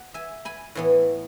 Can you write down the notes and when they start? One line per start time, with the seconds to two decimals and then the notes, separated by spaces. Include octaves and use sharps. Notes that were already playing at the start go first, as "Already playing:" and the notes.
Already playing: F#5
0.14 E5 G#5
0.45 G#5 B5
0.75 A2 E3 B3